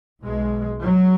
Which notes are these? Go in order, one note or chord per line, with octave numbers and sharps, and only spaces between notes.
B1 B2 G#3
F#3